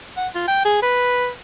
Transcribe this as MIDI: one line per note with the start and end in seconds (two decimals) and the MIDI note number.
0.17 0.28 78
0.35 0.47 65
0.48 0.61 79
0.65 0.77 68
0.83 1.29 71